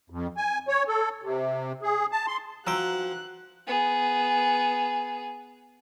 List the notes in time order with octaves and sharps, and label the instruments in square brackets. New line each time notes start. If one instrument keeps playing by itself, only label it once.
[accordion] F2
G#5
C#5
A4
C3
G#4
A5
C6
[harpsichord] F3 G5 [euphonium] F#4 [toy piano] A#5 E6 [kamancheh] F#6
[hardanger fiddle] B3 G#4